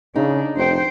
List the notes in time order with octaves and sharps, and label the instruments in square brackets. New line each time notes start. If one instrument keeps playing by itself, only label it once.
[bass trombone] C#3 [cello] D4 [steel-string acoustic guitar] D#4
[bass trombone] F1 [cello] C5 G5